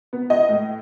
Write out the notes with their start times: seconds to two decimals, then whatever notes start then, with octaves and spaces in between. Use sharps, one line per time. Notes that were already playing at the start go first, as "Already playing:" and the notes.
0.13 B3
0.30 D#5
0.49 A2